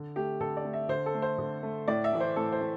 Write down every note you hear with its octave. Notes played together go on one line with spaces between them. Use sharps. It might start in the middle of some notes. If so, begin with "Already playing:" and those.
Already playing: D3
A3 G4
D3 A4
D5
A3
E5
D3 C5
A4
A3
C5
D3
A3
A2 D5
E5
E3 A3
C5
A2 A4
C5
A3